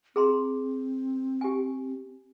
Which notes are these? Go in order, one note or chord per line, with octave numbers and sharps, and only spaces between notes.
C4 G#4 A#5 C6
G4 G#5